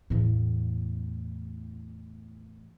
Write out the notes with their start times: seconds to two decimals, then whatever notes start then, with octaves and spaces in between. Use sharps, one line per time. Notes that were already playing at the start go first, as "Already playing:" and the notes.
0.10 E2 A2